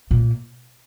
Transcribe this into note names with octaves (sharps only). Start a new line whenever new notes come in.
A#2